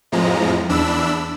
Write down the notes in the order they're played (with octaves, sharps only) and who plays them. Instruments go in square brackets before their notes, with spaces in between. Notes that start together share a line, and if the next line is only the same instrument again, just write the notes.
[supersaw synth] F2 A2 F3 G#3 A#5
E2 D4 B5 E6